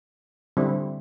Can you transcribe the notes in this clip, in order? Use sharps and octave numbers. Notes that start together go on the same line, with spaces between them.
D3 G3 C4 E4